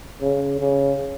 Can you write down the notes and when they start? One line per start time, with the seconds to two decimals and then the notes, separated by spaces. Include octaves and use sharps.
0.21 C#3
0.59 C#3